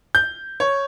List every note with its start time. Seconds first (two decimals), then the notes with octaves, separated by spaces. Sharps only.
0.15 G6
0.60 C#5